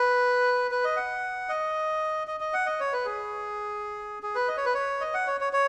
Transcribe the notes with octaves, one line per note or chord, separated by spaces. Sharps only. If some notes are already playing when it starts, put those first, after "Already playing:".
Already playing: B4
B4
D#5
F#5
D#5
D#5
D#5
F#5
D#5
C#5
B4
G#4
G#4
B4
D#5
C#5
B4
C#5
D#5
F#5
C#5
C#5
C#5